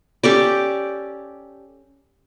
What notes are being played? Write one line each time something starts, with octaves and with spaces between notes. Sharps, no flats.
C#4 G4 A4 D5